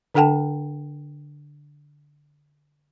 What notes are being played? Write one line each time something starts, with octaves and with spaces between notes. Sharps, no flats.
D3 D4 A4 F#5 G5 A5